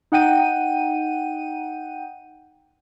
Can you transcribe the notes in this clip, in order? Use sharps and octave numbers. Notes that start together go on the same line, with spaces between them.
D#4 F#5 G5 D#7